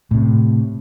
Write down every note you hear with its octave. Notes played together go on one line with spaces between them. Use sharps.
A2 C3